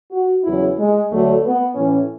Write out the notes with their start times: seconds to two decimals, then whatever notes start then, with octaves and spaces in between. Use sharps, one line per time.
0.11 F#4
0.44 E2 C#3 F#3 E4
0.78 G#3
1.10 D2 D3 F#3 A3
1.44 B3
1.75 A2 E3 C#4